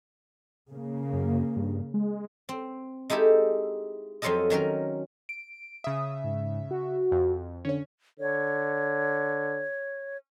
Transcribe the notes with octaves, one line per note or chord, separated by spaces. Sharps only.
C#3 A#3
F#2
G2
G#3
C4
G#3 D#4 E4 G4 A4
F2 F3 F#3 F4 A4 D#5
D#3 F#3 C#4 A#4
D7
C#3 E5 D#6
G#2
F#4
F2
D3 C#4 C#5
D3 C#5